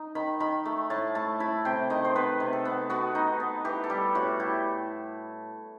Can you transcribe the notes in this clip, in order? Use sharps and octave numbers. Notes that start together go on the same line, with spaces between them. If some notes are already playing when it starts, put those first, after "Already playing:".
Already playing: D#4
D#3 B5
D#3 B5
A3 B5
A2 A5
A3 A5
E4 B5
C3 G5
D#3 D#5
C5
B3 B4
C3
A4
B3
B3 F#4
D#4
B3
E3 G4
A4
G3 G4
A2 F#4
E4 G4